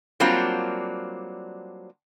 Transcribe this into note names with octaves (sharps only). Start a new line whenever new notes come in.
F#3 G3 A#3 C4 D4 F4